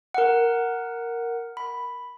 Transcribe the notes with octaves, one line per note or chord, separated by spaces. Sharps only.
A#4 F#5
B5